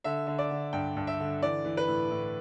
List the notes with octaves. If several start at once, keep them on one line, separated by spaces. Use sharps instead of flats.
D3 E5
D3
D5
D3
G2 G5
G2
E5
D3
E3 D5
E3
B4
A2
A2